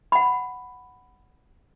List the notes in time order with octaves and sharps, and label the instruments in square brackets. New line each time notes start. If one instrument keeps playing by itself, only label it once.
[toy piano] F#5 B5